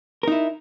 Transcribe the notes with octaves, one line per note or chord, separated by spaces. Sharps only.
D#4 E4 A#4